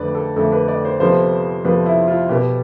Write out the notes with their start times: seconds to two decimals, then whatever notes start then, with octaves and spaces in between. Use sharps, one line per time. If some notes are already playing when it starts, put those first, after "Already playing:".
Already playing: F2 D3 A3 B4 D5
0.15 A4
0.36 F2 D3 A3 A4
0.52 B4
0.68 D5
0.85 C5
1.00 F2 C3 F3 B3 C5
1.64 F2 C3 F3 B3 B4
1.86 E4
2.07 F4
2.29 B2 B3 G4